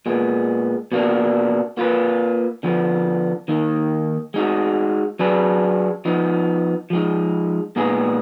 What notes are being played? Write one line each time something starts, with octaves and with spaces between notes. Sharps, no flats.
A#2 G#3 B3
B2 A#3 D4
A#3 F4 B4
D3 F3 B3
D#3 A#3 D#4
G#3 D#4 F#4
F#3 D4 G#4 B4
F3 B3 D#4
F3 G#3 D#4
A#2 G#3 B3 D#4 G#4